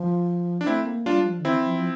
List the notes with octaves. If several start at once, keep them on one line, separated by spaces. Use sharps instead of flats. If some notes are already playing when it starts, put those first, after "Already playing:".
Already playing: F3
D4
A3 C4 E4
A#3
G3 D4 F4
G3
F3
D3
E3 C4 E4
F3
F3